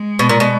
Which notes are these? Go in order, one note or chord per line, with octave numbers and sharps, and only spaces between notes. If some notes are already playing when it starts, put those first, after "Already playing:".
Already playing: G#3
B2
A#2
B2